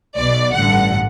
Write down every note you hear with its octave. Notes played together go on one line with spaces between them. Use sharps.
B1 B2 D5
A1 G2 D3 F#5